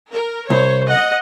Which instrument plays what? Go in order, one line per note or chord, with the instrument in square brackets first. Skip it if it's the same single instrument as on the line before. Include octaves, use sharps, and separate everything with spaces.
[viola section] A#4
[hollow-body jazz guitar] C2 [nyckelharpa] C5 [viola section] C#5
[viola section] D#5 [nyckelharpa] F#5